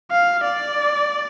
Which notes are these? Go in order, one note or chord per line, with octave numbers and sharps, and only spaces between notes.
F5
D5